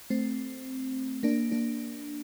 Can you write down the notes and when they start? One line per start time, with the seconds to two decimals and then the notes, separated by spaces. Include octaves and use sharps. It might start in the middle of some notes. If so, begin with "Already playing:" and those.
0.10 A3 C4
1.23 A#3 D4
1.52 A#3 D4